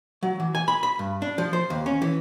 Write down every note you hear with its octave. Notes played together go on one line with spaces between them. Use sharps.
F#3
E3
G#5
B5
B5
G2
D4
F3
C5
D#2
C#4
E3